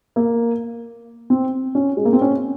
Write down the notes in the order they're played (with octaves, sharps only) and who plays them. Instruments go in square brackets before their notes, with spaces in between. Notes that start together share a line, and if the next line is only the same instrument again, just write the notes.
[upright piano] A#3
C4
C#4
G#3
A#3
C4
C#4